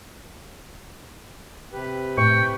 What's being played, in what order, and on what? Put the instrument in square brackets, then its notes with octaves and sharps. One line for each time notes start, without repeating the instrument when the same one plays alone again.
[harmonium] C3 G4 B4
[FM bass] A2 [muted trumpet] G5 [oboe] C#6